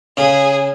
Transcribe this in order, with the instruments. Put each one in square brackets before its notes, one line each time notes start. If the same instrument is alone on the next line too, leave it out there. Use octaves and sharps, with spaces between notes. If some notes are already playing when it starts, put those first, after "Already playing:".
[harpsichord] C#3 [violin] G#4